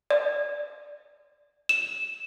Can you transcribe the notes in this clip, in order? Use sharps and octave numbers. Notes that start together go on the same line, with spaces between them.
D5
E7